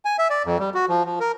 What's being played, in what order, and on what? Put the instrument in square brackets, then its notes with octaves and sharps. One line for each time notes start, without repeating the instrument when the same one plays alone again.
[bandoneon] G#5
E5
D5
F2
G3
F#4
F3
F3
A#4